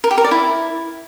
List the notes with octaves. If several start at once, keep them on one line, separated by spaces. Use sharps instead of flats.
A#4
G4
A#4
D5
E4